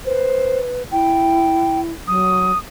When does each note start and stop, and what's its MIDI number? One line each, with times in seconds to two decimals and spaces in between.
0.05 0.83 71
0.05 0.59 72
0.92 1.92 64
0.92 1.80 79
2.08 2.52 54
2.08 2.58 87